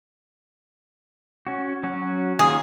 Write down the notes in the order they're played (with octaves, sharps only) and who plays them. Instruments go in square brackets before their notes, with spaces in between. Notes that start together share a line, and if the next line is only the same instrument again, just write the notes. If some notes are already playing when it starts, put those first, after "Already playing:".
[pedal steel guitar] C#4 F#4
F#3 C#4 F#4
[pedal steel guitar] D#3 A#3 F4 [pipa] G#4